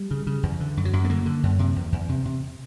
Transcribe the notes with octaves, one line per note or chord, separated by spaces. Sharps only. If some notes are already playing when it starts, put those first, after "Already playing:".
Already playing: G3
C#3
C#3
E2
D3
F#2
F#3
F#2
A3
D3 A#3
D3
F#2
C3
E2
E2
C3
C3